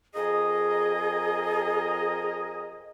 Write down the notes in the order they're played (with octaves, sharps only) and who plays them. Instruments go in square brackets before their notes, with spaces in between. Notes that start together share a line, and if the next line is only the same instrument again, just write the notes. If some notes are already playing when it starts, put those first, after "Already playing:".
[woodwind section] F2 A#4 D#5 [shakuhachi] G#4